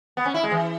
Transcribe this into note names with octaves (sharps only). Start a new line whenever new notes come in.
B3
C#4
E4
G#3
E3